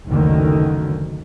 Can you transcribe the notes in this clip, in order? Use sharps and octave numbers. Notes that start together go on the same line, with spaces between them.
F#1 D2 D3 D#3